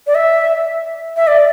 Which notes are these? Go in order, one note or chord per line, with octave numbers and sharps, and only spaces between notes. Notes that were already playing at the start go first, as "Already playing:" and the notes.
D5
E5
E5
D5